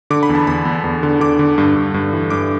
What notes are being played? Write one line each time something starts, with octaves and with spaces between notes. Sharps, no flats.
D3 D6
B5
E2
A5
E2 B5
E2
E2
D3
D3 D6
D3
G2
G2
G2
E3
G2 D6